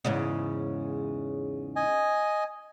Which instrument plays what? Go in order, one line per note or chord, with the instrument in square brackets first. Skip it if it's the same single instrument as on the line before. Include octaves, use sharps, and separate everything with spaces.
[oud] E2 G#2 C#3
[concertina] D#5 G#5